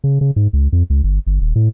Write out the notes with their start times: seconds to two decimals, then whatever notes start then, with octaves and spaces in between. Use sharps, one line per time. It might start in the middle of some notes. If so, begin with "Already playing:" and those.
0.04 C#3
0.21 C#3
0.36 G#2
0.53 C#2
0.72 F2
0.90 C#2
1.04 G1
1.27 G1
1.41 D#1
1.56 A2